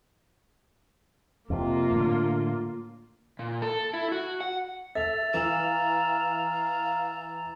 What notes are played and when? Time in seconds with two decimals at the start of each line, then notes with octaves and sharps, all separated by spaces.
1.50 F2 C3 A#3 F4
1.92 A2 D3
3.39 A#2
3.62 A4
3.94 E4
4.12 F#4
4.41 F#5
4.95 A4 E5 A6 F7
5.34 E3 F5 A#5 E6 E7